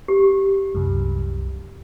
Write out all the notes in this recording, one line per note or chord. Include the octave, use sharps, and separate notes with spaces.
G4
C2 F#2